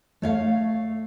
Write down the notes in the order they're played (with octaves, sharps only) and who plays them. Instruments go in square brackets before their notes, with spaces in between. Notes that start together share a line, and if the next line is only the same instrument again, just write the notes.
[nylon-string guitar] A3 C#5 F5